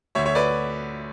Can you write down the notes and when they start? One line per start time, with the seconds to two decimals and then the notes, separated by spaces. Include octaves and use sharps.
0.15 D2 D3 C#5 E5
0.25 C#5 E5
0.35 B4 D5